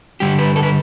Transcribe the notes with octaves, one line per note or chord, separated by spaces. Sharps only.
G2 D3 G3 G4
B4
A4
B4